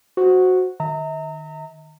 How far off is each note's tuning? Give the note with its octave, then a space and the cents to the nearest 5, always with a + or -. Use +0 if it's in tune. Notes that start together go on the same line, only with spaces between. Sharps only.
F#4 -5 C5 +0
D#3 -25 E5 -40 A#5 -30